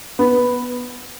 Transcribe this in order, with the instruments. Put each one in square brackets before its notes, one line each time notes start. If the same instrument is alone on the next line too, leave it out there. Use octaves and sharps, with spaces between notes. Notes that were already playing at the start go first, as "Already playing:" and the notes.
[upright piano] B3